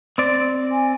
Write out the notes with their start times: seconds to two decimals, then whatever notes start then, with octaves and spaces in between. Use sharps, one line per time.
0.18 C4 D5
0.72 G#5